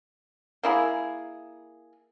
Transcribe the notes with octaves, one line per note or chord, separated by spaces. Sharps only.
A#3 E4 G#4